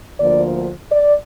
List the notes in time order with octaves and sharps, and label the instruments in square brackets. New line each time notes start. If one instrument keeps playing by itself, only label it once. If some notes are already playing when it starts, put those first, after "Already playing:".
[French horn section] D2 D3 F3 A#3 D5
D5